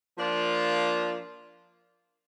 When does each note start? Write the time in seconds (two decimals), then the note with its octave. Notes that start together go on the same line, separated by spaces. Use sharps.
0.17 F3 A#3 D4 F4